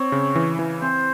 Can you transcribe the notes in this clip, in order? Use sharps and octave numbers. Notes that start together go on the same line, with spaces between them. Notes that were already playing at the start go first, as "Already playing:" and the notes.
Already playing: C4 C#5
C#3
E3
E3
C4 C5